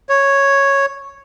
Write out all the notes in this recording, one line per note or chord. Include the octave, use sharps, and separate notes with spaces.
C#5